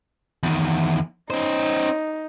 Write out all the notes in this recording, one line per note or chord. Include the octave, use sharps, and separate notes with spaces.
E2 D#3
C#4 D#4 C5